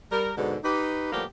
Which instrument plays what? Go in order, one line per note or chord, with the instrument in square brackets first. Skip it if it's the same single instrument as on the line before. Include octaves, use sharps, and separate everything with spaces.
[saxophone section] G3 A#4
G#2 B2 D3
D#4 G4 B4
A2 F3 G3 A#3 B3 G4